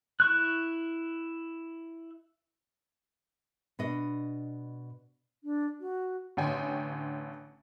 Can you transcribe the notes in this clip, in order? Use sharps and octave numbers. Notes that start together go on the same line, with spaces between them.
E4 C#6 F#6
B2 D4 D#5
D4
F#4
A1 D3 C#5 G5 G#5